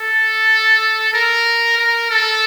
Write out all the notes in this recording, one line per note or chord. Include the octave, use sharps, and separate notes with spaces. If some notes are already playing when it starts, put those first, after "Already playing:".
Already playing: A4
A#4
A#4
A4